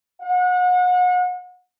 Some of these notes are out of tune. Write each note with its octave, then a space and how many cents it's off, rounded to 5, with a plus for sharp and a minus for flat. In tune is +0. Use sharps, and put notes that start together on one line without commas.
F#5 -35